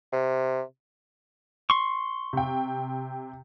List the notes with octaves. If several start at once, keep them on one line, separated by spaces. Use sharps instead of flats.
C3
C6 C#6
C3 G5